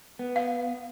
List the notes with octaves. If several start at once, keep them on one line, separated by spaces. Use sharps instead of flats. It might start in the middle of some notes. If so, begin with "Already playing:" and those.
B3
F5